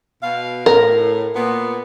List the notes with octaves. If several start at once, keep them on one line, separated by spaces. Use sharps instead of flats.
B2 F5
A2 A#4
A#2 B3